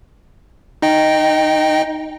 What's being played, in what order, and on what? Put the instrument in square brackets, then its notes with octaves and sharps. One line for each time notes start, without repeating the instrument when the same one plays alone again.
[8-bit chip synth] D#4 D#5 G5